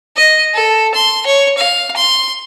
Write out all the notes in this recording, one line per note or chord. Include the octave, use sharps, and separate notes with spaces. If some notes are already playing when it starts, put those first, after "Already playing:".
D#5
A4
C6
C#5
F5
C6